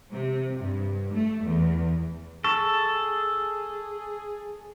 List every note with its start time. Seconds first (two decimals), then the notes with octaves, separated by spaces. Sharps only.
0.12 C3
0.59 G2
1.14 A3
1.45 E2
2.44 G#4 A4 C#6